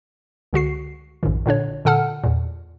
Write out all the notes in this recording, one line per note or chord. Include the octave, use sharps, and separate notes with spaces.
C#2 D3 F#4 C7
A#1 F#2 A2 D#3
A#2 D3 D4 C#5
A#2 D3 A4 F#5 A5 F6
E2 A#2